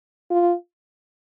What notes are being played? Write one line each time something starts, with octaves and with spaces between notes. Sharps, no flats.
F4